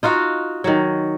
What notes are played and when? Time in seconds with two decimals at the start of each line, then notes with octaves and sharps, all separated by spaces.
0.03 D#4 F4 F#4 F5
0.64 D#3 F#3